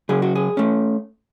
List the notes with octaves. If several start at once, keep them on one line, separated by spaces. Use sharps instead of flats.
C#3 F#3 C#4 G#4
F#4
G#4
A3 C#4